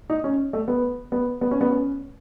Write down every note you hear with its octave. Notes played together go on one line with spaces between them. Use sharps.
D#4
C#4
A3
B3
B3
B3
C#4
B3
C#4